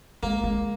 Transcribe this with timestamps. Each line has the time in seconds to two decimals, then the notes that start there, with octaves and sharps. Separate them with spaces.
0.23 G#3 A#3
0.44 G#3